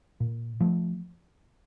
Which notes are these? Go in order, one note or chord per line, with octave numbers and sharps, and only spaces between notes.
A#2
F3 A3